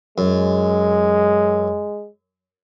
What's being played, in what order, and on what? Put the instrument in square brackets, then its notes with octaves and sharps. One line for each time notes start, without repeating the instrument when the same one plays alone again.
[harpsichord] F#2 [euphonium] G#3